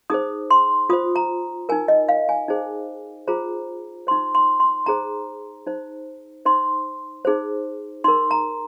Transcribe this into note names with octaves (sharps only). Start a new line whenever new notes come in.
D#4 G#4 C5 D#6
C6
F4 C5 D#6
A#5
D#4 A#4 G#5
D#5
F5
G#5
D#4 G#4 C5
F4 G#4 C5 A#5
D#4 C5 C6
C6
C6
D#4 G#4 C5 A#5
D#4 C5
D#4 C5 C6
D#4 G#4 C5
D#4 A#4 C6
A#5